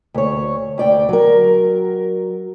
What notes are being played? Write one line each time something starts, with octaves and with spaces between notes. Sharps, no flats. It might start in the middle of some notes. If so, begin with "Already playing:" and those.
D2 C#5
D2 D5 G5
F#3 A#4